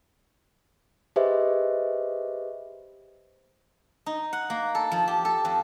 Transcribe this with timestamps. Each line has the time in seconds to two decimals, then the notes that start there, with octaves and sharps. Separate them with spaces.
1.16 G4 G#4 B4 C5 D#5 E5
4.06 D#4
4.33 F#5
4.50 A#3
4.75 A4
4.91 F3
5.08 G4
5.25 A4
5.45 F2